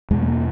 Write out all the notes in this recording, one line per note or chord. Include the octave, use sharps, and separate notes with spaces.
E2 B2 G#3
A3
A#3